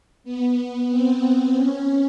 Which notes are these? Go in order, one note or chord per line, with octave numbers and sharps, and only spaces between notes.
B3
C4
C#4